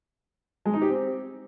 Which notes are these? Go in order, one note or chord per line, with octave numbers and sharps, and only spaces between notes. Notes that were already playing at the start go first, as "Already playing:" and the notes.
G#3
D#4
G4
C4